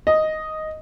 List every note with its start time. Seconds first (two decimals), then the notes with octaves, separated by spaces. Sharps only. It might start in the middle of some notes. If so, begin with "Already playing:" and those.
0.07 D#5